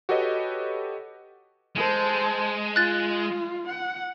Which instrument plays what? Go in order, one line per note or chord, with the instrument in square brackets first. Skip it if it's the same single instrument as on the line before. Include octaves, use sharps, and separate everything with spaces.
[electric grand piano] F#4 G4 A4 B4 C#5 D#5
[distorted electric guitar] G#3 [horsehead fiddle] A4 C5
[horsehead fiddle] F4 [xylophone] F#6 A6
[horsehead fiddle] F#5